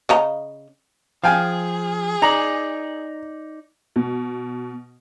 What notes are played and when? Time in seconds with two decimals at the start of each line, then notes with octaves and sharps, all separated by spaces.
0.09 C#3 D#5 A#5
1.24 F3 G#4 F5 G5 G#5
2.22 D#4 D5 A#5
3.96 B2